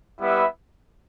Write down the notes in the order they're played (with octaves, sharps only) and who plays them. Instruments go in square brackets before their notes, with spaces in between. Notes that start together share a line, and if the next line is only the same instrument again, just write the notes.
[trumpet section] G3 B3 E4 B4 E5